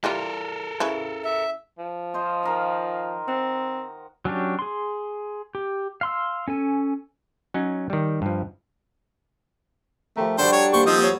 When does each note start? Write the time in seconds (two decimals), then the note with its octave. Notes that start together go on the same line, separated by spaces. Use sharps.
0.04 E3 G3 F4 A4 A#4
0.80 C#3 E4 B4
1.25 E5
1.79 F3
2.14 F4 C5 D#5
2.43 D#3 A#4 F5
3.28 C4 F#5
4.25 F#3 C#4 D4 G4
4.59 G#4 C6
5.55 G4
6.01 F5 C6 E6
6.48 C#4 A4 G#5
7.54 F#3 C#4 D#4
7.90 D#3 G3
8.22 G2 F3
10.17 F3 A3 G4 A#4
10.38 G3 D4 F#4 A4 C5
10.52 C#5
10.73 A#3 G4 C5 C#6
10.86 F3 C4 D#4 D#6
11.03 C#5